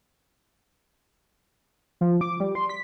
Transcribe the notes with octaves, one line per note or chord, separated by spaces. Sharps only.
F3
D6
G3
C6
B6